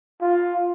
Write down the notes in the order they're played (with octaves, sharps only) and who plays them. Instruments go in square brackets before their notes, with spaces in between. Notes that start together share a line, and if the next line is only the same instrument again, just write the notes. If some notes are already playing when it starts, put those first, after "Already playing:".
[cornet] F4